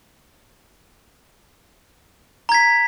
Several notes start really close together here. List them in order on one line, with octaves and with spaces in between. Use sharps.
A#5 G#6 B6